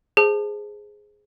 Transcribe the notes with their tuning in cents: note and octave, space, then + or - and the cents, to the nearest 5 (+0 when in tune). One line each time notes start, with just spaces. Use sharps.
G#4 +0 C5 +0 A5 +0